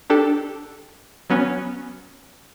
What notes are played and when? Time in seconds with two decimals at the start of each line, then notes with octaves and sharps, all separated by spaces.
0.10 D4 G4 A4
1.30 F#3 B3 C#4